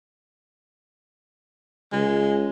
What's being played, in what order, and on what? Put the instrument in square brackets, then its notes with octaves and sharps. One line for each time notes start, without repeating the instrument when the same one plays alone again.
[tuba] C#2 [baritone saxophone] G#3